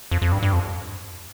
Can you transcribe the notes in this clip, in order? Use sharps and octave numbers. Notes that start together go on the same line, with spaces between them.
F2
F2
G2
G2
F2